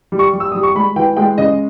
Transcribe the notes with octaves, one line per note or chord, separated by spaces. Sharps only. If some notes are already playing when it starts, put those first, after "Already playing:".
G3
C#6
G3
E6
G3 D#6
C#6
G#3 B5
E3 G5
G#3 G5
C#3 D#5